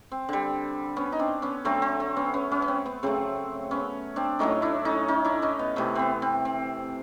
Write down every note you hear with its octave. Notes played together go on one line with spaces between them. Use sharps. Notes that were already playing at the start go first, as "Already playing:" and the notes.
C4
D3 G3
B3 C#4
D#4
C4 D4
B3 C#4
D3 F#3 A3 C4
C4
C4
B3 C#4
B3 C#4
B3 C#4
C#4
C4
B3
C#3 F#3 A3 C4
B3 C#4
C4 D4
A2 F#3 A3 C#4 D#4
D4 E4
C#4 D#4
C#4 D#4
D4 E4
C#4 D#4
B3
C3 E3 A3 B3
B3 C4
C4
C4